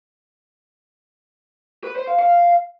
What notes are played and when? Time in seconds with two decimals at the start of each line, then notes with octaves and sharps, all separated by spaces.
1.84 B4
1.96 C5
2.07 F5
2.19 F5